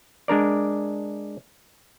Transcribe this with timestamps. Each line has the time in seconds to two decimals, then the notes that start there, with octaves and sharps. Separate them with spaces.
0.28 G#3 D4 A#4 D5